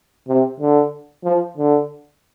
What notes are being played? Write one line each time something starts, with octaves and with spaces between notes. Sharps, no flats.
C3
D3
F3
D3